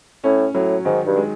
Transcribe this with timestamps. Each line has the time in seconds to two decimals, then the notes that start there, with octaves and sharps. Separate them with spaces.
0.24 A2 C#4
0.54 A2 F#3
0.85 G#2 D#3
1.06 G2
1.16 G#3